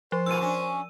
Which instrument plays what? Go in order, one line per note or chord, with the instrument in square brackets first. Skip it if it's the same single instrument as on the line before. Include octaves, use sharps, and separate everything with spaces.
[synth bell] F3 [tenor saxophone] C5
[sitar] G#2 B2 F4 [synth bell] E6 D#7
[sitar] C#4 D4 F#4